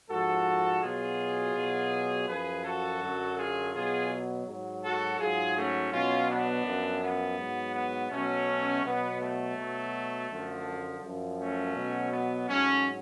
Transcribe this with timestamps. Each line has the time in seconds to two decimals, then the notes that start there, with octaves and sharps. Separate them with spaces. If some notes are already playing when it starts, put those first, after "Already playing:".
0.10 G#2 F3 F#4 A4
0.82 B2 F#3 F4 G#4
1.55 B2 F#3
2.28 F#2 F3 G#4 B4
2.65 F#4 A4
3.01 F#2 D3 F#3
3.37 F4 G#4
3.74 B2 F#3 F4 G#4
4.47 G#2 F#3
4.83 F#4 A4
5.19 G#2 F#3 F4 G#4
5.56 A3 C#4
5.92 B2 F#3 C#4 F4
6.29 B3 D4
6.65 F#2 F3
7.02 B3
7.38 G#2 F#3
7.75 B3
8.11 B2 F#3 A3 C#4
8.84 B2 F#3 B3
9.21 A3
9.57 B2 F#3
10.30 F#2 D3 F3
11.03 F#2 F3
11.38 A3 C#4
11.76 B2 F#3
12.12 B3
12.48 G#2 F#3 A3 C#4